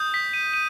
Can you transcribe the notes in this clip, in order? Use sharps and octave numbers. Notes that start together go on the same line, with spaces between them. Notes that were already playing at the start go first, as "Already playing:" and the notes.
Already playing: D#6 G6
B6
D#7
D#7